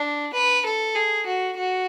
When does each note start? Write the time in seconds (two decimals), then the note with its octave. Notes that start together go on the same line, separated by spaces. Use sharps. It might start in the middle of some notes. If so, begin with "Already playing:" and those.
Already playing: D4
0.34 B4
0.66 A4
0.95 G#4
1.26 F#4
1.58 F#4